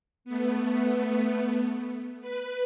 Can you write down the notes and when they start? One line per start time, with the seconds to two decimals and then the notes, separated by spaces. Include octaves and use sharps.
0.25 A3 B3
2.21 B4